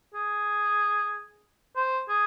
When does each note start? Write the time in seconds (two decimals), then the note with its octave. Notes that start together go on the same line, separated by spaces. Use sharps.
0.14 G#4
1.76 C5
2.09 G#4